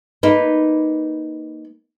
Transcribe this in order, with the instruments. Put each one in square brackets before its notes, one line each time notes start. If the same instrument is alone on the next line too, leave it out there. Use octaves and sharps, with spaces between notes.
[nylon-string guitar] A#3 D#4 B4